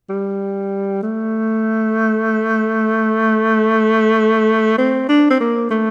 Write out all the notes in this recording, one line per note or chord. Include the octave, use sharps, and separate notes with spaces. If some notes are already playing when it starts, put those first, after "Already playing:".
G3
A3
C4
D4
C4
A#3
A3